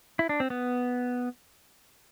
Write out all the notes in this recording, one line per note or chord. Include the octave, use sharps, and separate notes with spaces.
E4
D4
C4
B3